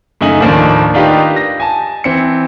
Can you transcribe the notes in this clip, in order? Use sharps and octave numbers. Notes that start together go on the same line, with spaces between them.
F#2 C#3 A3 D#4 G#5 F#7
D#2 A2 D#3 F3 A#3 D4
D#3 D4 D#4 F4 G4 B4
A#6
G#5 A5
E3 C4 C#7